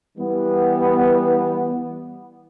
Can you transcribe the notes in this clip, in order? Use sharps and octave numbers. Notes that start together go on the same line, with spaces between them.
E3 G3 B3